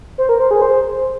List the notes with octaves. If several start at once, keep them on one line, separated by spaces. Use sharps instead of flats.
C5
A#4
C5
G#4
C5